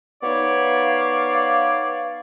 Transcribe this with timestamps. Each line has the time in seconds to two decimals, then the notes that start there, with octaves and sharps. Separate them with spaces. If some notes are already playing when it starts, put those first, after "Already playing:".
0.23 B3 D#4 C#5 D5 F5